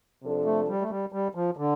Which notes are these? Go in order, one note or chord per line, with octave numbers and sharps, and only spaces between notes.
C3 F3 D4 A4
A3
G3
A3
G3
G3
F3
D3